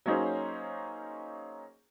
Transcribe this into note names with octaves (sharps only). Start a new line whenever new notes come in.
F#3 A#3 C#4 D#4 G#4 C5